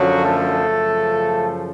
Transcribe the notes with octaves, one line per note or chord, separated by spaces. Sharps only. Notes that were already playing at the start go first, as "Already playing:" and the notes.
Already playing: F#2 D3 F3 F#3 F#4
A3 A4
F#2 C#3 F3